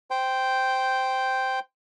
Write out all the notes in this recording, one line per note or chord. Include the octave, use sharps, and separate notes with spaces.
C5 G5